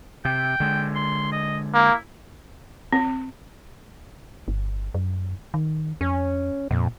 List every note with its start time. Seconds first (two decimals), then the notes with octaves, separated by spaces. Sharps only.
0.25 C3 G5
0.60 D3 G#3
0.96 C6
1.32 D#5
1.74 A#3 E4
2.92 C4
4.48 G1
4.94 F#2
5.54 D#3
6.01 F2 C#4
6.71 F2 A#2